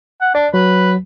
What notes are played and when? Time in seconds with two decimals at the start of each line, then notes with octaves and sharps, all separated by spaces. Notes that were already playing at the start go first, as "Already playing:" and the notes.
0.22 F#5
0.35 D4 D5
0.54 F#3 B4